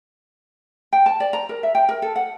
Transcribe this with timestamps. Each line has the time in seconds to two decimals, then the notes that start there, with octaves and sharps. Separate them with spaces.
0.93 G5
1.06 A5
1.20 D5
1.33 A#5
1.49 A#4
1.63 E5
1.75 G5
1.89 A#4
2.02 A4
2.16 F#5